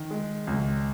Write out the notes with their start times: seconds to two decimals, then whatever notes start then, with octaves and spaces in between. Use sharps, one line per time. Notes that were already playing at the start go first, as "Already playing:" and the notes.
Already playing: D#3
0.11 G#3
0.47 C#2